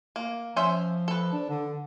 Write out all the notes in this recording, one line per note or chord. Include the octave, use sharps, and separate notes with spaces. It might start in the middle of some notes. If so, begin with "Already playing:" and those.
A#3
F3 C#4 C5 E5
A4 B4
D4
D3